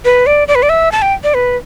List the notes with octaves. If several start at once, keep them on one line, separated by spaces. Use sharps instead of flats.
B4
D5
D5
B4
D5
E5
A5
G5
D5
B4